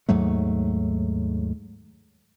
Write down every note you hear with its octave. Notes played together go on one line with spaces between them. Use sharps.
D#2 G#2 F#3 A3